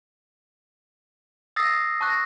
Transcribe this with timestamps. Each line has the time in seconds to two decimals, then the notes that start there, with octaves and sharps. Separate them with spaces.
1.56 D#6 E6 A6 A#6 C7
2.01 A5 C#6 F#6 A#6